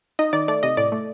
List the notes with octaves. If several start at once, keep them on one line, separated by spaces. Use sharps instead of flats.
D#4 D#5
D#3 D5
A3 D5
C3 D#5
A2 D5
A3